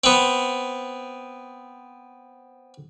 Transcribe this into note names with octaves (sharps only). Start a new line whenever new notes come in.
B3 C4